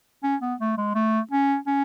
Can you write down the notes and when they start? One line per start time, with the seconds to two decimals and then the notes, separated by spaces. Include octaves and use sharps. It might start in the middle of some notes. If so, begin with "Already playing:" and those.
0.23 C#4
0.42 B3
0.60 A3
0.78 G#3
0.95 A3
1.31 C#4
1.67 C#4